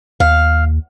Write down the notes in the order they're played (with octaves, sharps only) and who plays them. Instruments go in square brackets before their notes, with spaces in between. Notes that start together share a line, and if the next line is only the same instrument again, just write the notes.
[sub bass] D#2 [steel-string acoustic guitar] F5